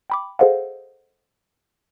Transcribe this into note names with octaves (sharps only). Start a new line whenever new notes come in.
G5 B5 D6
G#4 A4 C5 D#5 F5 F#5